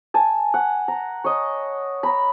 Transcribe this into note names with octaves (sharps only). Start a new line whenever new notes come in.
G#5 A5
F#5
A#5
C#5 D#5
A#5 B5